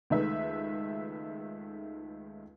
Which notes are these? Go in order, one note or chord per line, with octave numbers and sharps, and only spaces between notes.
C#2 D#3 A3 B4 E5